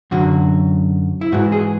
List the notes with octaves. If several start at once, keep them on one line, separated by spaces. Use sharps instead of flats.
F#2 D3 F#3 F#4
E4
G#2 E3 F#4
G#4